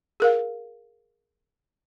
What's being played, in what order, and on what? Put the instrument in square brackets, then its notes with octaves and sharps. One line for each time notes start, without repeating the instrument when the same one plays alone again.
[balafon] G#4 A#4 F5